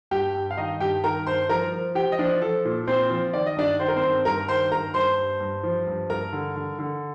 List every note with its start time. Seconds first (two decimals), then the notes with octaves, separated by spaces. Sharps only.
0.11 G2 G4 G5
0.35 G2
0.51 F5
0.57 D#3 D#4 D#5
0.80 G2 G4 G5
1.04 D#3 A#4 A#5
1.26 G2 C5 C6
1.49 F3 A#4 A#5
1.73 F3
1.95 F3 G4 G5
2.12 D#5
2.19 F3 D4 D5
2.42 F3 A4
2.65 A#2
2.87 A#2 C4 C5
3.10 F3
3.33 D#3 D5
3.46 D#5
3.57 G2 D4 D5
3.79 D#3 C5
3.88 A#4
3.96 C4 C5
4.03 G2
4.25 G2 A#4 A#5
4.48 D#3 C5 C6
4.71 G2 A#4 A#5
4.94 G2 C5 C6
5.18 G2
5.40 G2
5.64 F3
5.87 G2
6.10 G2 A#4 A#5
6.33 D3
6.56 D3
6.79 D3